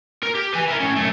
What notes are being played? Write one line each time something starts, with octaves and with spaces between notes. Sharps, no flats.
A#4
G4
B4 G#5
E4 A#4
A2 C#4
F#2 A3